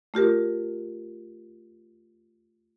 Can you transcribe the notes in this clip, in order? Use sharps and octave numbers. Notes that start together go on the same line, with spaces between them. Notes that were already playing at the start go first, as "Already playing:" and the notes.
A3 F4 G4 A#4